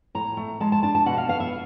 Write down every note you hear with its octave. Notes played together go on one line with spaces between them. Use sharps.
A2 A#5
A3
G#3 A5
A5
D4 A5
A5
B2 F#5
F5
B3 F5
E5